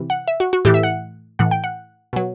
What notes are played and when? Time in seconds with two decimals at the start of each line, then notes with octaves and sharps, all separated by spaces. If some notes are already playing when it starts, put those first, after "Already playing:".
Already playing: C3 E3
0.10 F#5
0.28 E5
0.40 F#4
0.53 F#4
0.65 A2 E3 G4
0.74 E5
0.83 F#5
1.39 A2 E3 F#5
1.51 G5
1.64 F#5
2.13 B2 F#3